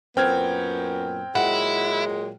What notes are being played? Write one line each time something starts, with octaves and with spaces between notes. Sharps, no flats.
F#2 A#2 B3 C4 G5 F6 G#6
A#2 F#3 G#3 E4 F#5